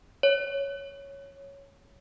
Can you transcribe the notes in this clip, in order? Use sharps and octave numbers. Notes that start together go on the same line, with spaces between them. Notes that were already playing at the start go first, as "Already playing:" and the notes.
C#5